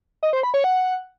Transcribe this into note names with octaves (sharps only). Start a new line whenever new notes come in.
D#5
C5
B5
C#5
F#5